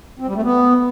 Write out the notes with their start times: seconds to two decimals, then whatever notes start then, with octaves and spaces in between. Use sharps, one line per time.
0.19 C4
0.27 G3
0.35 A3
0.43 B3